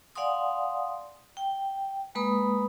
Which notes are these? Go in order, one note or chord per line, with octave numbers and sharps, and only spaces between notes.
D5 F5 F#5 G#5 C6 D#6
G5
G#3 A#3 B4 B5 D#6